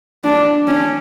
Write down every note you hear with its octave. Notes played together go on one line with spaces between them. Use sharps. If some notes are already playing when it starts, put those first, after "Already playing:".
D4
C#4